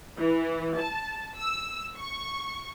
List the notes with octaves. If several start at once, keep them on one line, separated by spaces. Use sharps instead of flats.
E3
A5
E6
C#6